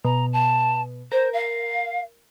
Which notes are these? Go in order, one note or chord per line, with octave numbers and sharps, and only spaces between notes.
B2 A#5
A5
A#4 C5
F5